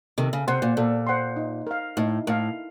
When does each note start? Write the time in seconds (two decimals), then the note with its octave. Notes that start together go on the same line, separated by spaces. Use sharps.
0.18 C3 D#3 A4
0.33 C#3
0.48 C3 C5 F#5 C6
0.62 A#2
0.77 A#2 A4
1.07 C5 F#5 C6
1.36 D#4
1.67 A#4 F5
1.97 A2 D#4
2.27 A2 A#4 F5